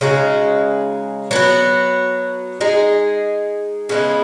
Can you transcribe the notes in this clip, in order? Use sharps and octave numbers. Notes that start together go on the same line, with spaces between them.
C#3 G#3 D#4 F#4
F#3 B3 F#4
G#3 D#4 G#4
C#3 G#3 B3 E4